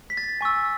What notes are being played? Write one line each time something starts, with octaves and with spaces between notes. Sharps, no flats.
B6
A6
G#5 C#6 E6